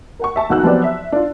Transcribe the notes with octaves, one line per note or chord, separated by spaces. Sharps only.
A#4 F#5 C#6
E5 A5 C#6
B1 D#3 F#4 E6 F#6
F3 F#3 B3 C4 G4 D5
E5
D4 F4